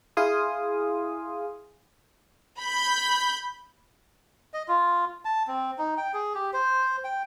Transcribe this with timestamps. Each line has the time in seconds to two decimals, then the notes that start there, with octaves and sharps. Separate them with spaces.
0.17 E4 G#4 F5 G#5 C6 D#6
2.59 B5 G6
4.54 D#5
4.68 F4
5.25 A5
5.47 C4
5.78 D#4
5.98 G5
6.14 G#4
6.35 G4
6.53 C5
7.04 G5